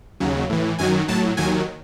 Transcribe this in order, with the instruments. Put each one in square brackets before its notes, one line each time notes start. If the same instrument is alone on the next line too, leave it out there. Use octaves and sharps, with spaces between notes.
[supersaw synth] D#2 C#3 F#3
A2 E3
F#2 D#3 F#3 G#5
A2 F#3 A5
D#2 D#3 F#3 G#5